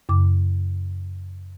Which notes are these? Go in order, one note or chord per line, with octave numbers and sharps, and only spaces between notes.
F#2 C#3 D6